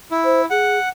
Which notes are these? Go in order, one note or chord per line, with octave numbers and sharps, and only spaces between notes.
E4
C5
G#4 F#5